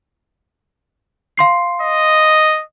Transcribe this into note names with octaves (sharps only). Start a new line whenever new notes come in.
F5 C6 C7
D#5